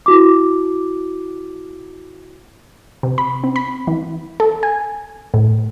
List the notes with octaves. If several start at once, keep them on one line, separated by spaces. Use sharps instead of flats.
E4 F#4 D6
C3
B5
C4
B5
E3
A4
G#5
A2